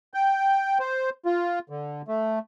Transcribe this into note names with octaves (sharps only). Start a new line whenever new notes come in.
G5
C5
F4
D3
A3